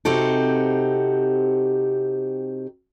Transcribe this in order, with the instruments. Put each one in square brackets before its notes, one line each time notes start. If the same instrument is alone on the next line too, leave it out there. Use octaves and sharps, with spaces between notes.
[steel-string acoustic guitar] C3 C4 D#4 F#4 G4 A4